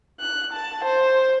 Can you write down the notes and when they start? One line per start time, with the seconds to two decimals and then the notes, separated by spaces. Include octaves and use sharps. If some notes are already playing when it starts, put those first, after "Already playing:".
0.21 F#6
0.53 A5
0.85 C5